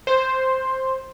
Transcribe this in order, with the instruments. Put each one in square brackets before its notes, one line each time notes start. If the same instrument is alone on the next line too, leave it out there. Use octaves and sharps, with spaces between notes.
[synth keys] C5